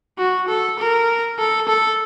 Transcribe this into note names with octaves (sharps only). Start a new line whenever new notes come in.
F#4
A4
A#4
A4
A4